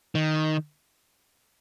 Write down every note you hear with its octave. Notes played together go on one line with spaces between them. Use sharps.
D#3